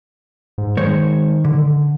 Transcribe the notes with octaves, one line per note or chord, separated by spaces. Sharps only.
G#2
D#3 G#3 C5 C#5
D3